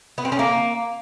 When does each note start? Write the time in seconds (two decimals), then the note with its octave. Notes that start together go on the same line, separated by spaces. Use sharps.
0.18 B3
0.25 C4
0.32 C#4
0.39 A#3